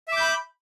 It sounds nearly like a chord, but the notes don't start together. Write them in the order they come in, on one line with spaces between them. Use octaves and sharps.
E5 D6 G6 B5